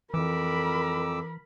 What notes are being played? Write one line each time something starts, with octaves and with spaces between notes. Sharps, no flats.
F2 E3 A#4 B5 D6 E6